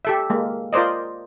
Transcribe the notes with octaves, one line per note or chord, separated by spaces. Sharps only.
G4 A4 E5
G#3 A#3
F4 A#4 C5 D5 D#5